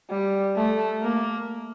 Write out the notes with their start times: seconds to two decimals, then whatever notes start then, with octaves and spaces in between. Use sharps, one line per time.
0.10 G3
0.56 A3
1.02 A#3